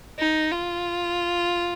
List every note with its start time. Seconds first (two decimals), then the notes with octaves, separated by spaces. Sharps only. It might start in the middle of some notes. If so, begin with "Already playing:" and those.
0.19 D#4
0.52 F4